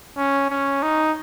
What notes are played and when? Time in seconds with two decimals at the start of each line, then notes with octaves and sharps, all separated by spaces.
0.17 C#4
0.50 C#4
0.83 D#4